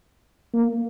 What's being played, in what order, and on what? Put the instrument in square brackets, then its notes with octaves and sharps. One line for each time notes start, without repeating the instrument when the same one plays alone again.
[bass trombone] A#3